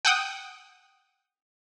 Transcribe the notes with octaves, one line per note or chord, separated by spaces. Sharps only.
F#5 G5 D#6